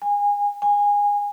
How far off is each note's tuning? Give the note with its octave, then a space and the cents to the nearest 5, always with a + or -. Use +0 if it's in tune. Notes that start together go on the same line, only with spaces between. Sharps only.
G#5 -25
G#5 -20